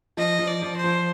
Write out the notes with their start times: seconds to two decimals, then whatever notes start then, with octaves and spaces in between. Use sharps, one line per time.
0.17 F3 D#5
0.39 F3
0.47 D5
0.62 F3
0.76 C5
0.84 F3